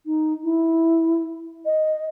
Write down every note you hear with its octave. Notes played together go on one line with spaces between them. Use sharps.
D#4
E4
D#5